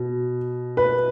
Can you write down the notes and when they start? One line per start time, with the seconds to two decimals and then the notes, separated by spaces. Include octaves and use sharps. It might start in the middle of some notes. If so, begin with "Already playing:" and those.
Already playing: B2
0.77 B4